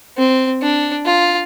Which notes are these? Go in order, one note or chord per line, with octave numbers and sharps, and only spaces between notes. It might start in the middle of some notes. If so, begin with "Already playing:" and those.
C4
D4
F4